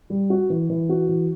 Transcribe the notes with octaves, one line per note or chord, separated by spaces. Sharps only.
G3
F#4
E3
E3
F#4
E3